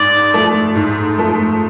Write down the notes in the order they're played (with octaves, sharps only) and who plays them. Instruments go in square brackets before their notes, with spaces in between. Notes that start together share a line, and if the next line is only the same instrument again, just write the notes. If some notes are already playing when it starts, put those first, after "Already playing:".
Already playing: [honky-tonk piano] G#2 [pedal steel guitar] D5
[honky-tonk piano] F3 A3
G#2
F3 A3